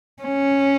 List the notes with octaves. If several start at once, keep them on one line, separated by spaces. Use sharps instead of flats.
C#4